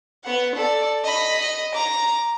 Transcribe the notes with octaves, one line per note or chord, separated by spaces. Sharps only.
B3 F#5
A4 D5
D#5 B5
D#5
A#5 D6